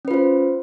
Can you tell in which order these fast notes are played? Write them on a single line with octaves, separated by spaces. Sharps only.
C#4 B4 F4 C5